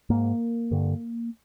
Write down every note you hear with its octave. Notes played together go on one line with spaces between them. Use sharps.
G#2 A#3
G2 D3